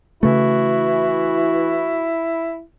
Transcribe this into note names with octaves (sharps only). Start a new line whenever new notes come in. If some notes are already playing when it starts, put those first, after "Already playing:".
C#3 E3 A3 E4 F#4